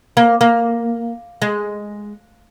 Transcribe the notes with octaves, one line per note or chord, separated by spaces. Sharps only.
A#3
A#3
G#3